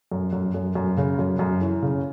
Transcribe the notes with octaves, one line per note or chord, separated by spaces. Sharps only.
F#2
F#2
F#2
F#2
C#3
F#2
F#2
E3
C#3